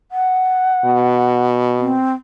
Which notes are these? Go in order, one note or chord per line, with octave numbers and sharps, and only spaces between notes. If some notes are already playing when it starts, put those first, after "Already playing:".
F#5
B2
C4